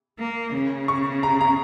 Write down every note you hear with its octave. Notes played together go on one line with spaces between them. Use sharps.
A#3
C#3
C#6
A#5
A#5